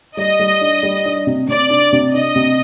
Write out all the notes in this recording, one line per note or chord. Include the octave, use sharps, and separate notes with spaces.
G3 D#5
G3
D4
G3
D4
C3
C3 D5
D4
C3
D4 D#5
C3